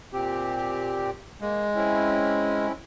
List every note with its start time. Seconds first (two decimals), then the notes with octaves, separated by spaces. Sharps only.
0.13 A#2 C4 G4
1.41 G#3 A#3
1.75 C4 C#4 E4